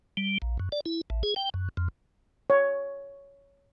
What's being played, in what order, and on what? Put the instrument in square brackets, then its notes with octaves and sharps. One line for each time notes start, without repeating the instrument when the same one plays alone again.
[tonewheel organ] G3
A#1
F#2
D5
E4
A1
G#4
G5
F#2
F2
[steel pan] C#5